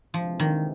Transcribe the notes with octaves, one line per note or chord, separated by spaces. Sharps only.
C3 E3 F3 G#3 C4
D#3